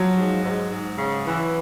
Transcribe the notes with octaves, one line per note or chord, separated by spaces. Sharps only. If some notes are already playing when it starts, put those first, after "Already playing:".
Already playing: F3 F#3
G#2
G#2
G#2
C#3
E3